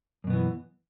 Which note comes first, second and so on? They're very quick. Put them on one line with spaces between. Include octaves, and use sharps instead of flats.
F#2 B2 B3 E3